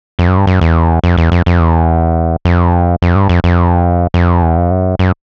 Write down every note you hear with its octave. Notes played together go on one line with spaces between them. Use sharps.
F2
F#2
G2
F#2
E2
F2
E2
F2
F2
E2
F2
F2
G2
F2
F2
F2
E2
F2
F#2
F#2